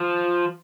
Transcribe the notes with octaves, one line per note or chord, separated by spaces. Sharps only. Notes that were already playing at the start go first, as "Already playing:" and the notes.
Already playing: F3